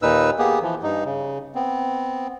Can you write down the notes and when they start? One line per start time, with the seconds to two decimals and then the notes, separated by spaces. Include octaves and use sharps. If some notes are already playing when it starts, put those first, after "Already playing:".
0.02 D#2 A#2 D#4 B4 E6
0.39 A#3 B3 G4 G#4
0.62 E3 F3
0.83 G2 D#4
1.05 C#3
1.55 B3 C4